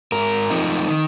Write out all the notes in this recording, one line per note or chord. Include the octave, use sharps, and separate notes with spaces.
G#2 A#4
F3 C4 D#4
D#3